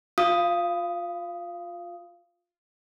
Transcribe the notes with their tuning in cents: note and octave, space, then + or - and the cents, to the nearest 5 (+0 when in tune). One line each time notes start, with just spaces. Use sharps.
F4 +20 F5 -15 D#6 +0